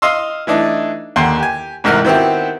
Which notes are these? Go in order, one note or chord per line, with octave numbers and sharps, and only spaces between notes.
D#5 F5 C6 E6
E3 A3 D4 D#4
D#2 D3 F#5 C6 F#6
G4 G#5
A1 G#2 C3 A#4 F#5 F6
D#3 B3 C4 E4 F#4 G4